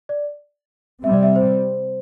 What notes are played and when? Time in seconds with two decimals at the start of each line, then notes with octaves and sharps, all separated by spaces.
0.09 D5
1.04 C3 G3 C4 E5
1.13 D5
1.23 E5
1.36 C5